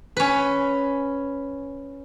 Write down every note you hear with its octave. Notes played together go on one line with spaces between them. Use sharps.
C#4 B4